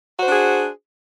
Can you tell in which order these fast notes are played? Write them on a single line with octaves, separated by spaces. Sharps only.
F#4 C5 D4 G#4